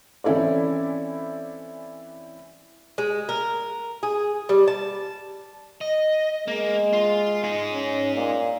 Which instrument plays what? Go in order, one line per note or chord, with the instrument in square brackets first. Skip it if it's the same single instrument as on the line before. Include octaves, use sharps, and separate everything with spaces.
[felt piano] E3 C4 C#4 E4 A4 D5
[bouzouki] G#3
A#4
G#4
G3
A5
[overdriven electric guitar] D#5
[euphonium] G#3 [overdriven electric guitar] A#3
[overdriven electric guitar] F4
D#4 G#4
[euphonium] C#4
A#2